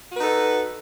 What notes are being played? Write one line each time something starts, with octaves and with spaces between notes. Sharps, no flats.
D#4 F#4 A4 B4